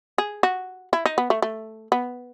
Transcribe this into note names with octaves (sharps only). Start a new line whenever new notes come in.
G#4
F#4
E4
D#4
B3
A3
A3
B3